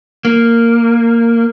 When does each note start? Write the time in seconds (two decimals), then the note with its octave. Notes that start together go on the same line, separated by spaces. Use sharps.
0.25 A#3